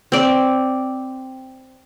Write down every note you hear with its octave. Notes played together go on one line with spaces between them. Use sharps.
C4 D5